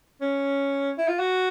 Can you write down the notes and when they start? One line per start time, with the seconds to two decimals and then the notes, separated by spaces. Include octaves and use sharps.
0.21 C#4
0.98 E4
1.08 F4
1.19 F#4